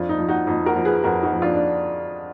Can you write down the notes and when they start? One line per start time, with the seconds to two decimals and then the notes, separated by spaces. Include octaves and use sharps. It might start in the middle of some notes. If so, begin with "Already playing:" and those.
Already playing: F2 D4 F4
0.09 D#4
0.19 F3
0.28 D#4 F#4
0.47 F2 D#4
0.66 F#4 A#4
0.75 F3
0.85 G#4 B4
1.04 F2 F#4 A#4
1.23 D#4 F#4
1.33 F3
1.42 D4 F4
1.54 D4